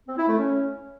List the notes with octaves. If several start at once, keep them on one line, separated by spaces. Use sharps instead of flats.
C4
E4
A3
C#4